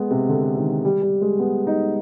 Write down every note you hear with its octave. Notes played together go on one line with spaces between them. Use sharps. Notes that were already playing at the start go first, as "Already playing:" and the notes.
Already playing: G#3 B3
C3
D3
D#3
G3
G3
G#3
B3
D#4